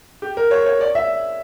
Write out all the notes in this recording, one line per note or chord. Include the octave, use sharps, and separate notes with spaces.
G4
A#4
C#5
C#5
D5
E5